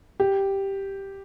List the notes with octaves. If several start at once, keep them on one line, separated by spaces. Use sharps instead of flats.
G4